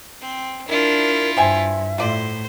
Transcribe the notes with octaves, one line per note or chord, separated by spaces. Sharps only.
C4
D4 E4 F4 A#4
G2 C5 E5 G5 G#5
A2 F4 C5 D5